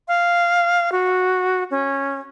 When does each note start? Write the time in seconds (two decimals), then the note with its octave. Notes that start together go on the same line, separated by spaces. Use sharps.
0.08 F5
0.92 F#4
1.71 C#4